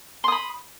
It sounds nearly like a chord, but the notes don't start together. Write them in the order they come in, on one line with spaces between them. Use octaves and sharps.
C6 D#6 B5